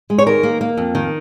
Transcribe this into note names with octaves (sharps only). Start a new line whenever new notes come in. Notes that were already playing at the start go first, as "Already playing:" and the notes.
G#3
C#5
D#3 A#4
A#3
A#3
F2
D#3